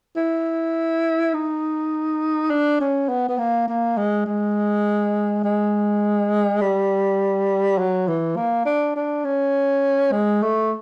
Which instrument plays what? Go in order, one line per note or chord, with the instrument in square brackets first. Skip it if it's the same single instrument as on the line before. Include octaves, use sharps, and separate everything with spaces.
[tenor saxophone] E4
D#4
D4
C#4
B3
B3
A#3
A#3
G#3
G#3
G#3
G3
F#3
E3
A#3
D4
D4
C#4
G#3
A3